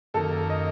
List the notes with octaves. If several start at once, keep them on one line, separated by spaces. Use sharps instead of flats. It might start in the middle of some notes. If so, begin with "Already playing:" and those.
F#2 D#3 A#3 A4
D#5